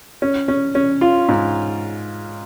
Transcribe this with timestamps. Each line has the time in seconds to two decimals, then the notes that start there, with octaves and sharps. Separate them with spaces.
0.22 C#4
0.48 C#4
0.75 C#4
1.01 F4
1.29 G#2